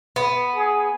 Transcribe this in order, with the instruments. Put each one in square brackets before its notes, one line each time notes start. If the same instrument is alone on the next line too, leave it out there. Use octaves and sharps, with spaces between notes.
[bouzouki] B3
[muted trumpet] G#4